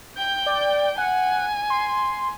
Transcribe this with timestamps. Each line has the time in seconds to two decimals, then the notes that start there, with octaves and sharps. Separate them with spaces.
0.17 G5 G6
0.46 D5
0.98 F#5 G#5
1.70 C6